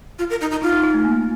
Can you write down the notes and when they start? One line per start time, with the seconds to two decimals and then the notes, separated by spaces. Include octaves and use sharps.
0.19 F4
0.30 A#4
0.41 D#4
0.51 D#4
0.62 D#4 F4
0.73 D#4
0.84 D#4
0.94 A3
1.05 A#3